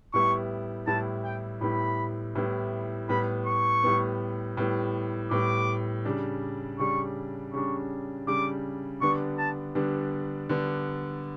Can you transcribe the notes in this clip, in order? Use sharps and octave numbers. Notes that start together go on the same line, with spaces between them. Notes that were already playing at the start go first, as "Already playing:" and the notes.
A2 G3 B3 E4 C#6
A2 G3 B3 E4 A5
G5
A2 G3 B3 E4 B5
A2 G3 B3 E4
A2 G3 B3 B5
C#6
A2 G3 B3
A2 G3 B3
A2 G3 B3 D6
C#3 G3 D4
C#3 G3 D4 C#6
C#3 G3 D4 C#6
C#3 G3 D4 D6
D3 G3 B3 D4 C#6
A5
D3 G3 B3 D4
D3 G3 B3 D4